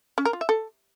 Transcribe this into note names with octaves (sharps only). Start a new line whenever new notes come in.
C#4
A#4
F4
E5
A4